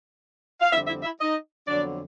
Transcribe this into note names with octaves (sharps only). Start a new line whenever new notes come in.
F5
F2 D3 G3 C4 E4 E5
E4 E5
E4 E5
D#4 D#5
F2 D3 F#3 B3 D4 D5